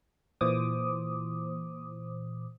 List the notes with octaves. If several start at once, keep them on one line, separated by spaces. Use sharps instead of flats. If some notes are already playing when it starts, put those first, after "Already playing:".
A#2 E3 C5 D6 D#6